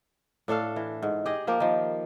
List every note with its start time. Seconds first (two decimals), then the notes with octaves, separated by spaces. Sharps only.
0.48 A2 D4 A4 F5
0.76 E3
1.02 G#2
1.26 G4 G#4 D#5
1.47 F3 A#3 G4
1.60 D#3 F3